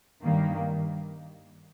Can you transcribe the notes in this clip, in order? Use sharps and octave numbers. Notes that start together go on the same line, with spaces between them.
G2 D#3 G3 A#3